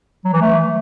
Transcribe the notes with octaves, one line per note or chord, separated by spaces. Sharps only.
F#3
E3
A3